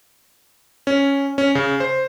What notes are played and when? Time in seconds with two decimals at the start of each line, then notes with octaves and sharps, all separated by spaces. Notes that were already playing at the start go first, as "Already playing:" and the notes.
0.87 C#4
1.38 C#4
1.55 C#3
1.80 C5